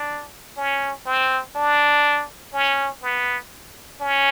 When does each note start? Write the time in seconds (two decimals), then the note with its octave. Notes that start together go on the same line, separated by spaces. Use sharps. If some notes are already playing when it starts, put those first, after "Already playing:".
Already playing: D4
0.57 C#4
1.06 C4
1.55 D4
2.54 C#4
3.02 B3
4.01 C#4